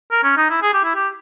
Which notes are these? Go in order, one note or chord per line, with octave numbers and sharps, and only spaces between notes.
A#4
C#4
D#4
E4
G#4
G4
E4
G4